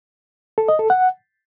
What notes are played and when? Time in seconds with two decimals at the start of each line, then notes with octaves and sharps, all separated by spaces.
0.58 A4
0.68 D#5
0.79 A4
0.90 F#5